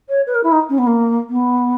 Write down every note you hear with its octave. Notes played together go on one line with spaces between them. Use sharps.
C#5
B4
A#4
E4
D#4
C#4
B3
A#3
B3